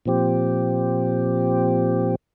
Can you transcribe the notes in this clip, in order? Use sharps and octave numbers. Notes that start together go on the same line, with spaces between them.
A#2 F3 C4 G4